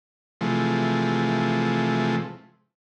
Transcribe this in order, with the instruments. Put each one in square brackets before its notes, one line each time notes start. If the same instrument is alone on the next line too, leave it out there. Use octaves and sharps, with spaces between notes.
[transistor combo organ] C3 E3 F3 G#3 A3